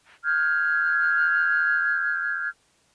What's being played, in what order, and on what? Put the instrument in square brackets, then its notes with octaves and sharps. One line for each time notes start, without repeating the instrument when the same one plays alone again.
[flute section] F6 G6 G#6